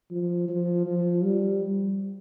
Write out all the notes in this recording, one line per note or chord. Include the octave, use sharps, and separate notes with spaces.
F3
F3
F3
G3